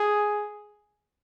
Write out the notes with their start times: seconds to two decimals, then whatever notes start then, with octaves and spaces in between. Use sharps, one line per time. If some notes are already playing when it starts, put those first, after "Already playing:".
Already playing: G#4